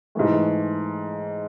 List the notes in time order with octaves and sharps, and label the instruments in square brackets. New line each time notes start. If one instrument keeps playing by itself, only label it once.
[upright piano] G#2 E3 A3